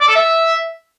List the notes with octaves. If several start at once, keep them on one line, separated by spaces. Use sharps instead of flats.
D5
A4
E5